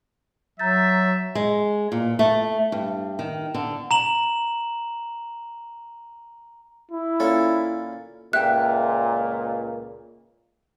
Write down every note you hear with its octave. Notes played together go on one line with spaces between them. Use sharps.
F#3 E5 A#5 G6 A6
G#3
A#2
A3
G2
D#3
D3
A#5 E7 F#7
E4
A#2 C#4 A4
C#2 A#2 E5 G5 F#6